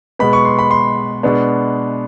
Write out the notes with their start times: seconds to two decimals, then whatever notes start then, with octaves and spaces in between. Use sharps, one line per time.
0.19 B2 G#3 B3 B5
0.33 C#6
0.45 C6
0.59 B5
0.71 C6
1.23 B2 G#3 B3 D4